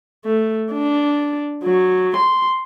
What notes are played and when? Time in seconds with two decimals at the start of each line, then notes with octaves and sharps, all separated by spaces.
0.25 A3
0.73 D4
1.64 F#3
2.17 C6